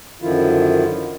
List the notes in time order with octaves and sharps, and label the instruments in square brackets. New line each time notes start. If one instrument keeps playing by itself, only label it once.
[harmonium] F#2 D3 D#3 F3 E4 F4